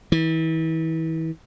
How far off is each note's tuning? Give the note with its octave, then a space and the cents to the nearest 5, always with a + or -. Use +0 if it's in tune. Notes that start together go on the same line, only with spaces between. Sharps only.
E3 -35